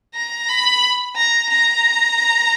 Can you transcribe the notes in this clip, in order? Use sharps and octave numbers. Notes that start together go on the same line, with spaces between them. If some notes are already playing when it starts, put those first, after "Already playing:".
A#5
B5
A#5
A#5